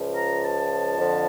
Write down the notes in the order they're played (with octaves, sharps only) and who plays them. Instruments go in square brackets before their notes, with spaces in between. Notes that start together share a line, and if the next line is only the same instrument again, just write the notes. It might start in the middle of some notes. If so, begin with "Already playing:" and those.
Already playing: [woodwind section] C#2 C#3 F3
A#5
A5
F2 D3 F3